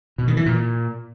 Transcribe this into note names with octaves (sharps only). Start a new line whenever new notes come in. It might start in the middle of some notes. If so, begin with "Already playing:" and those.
B2
D#3
E3
A#2